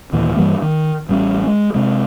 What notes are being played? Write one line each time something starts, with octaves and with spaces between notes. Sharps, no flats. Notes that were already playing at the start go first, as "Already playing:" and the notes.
D#2 A#2 E3
G2 E3 G3 A#3
D#3
A1 G3 C#4
G#3
C3 G#3